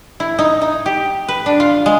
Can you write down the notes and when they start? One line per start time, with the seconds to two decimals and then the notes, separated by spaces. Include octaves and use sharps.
0.20 E4
0.39 D#4
0.62 D#4
0.86 G4
1.28 B4
1.46 D4
1.60 F4
1.86 G#3